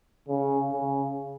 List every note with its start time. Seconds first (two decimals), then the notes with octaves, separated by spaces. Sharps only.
0.28 C#3
0.72 C#3